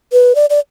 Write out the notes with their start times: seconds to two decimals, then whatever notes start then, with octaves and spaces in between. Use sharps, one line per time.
0.12 B4
0.35 D5
0.50 D5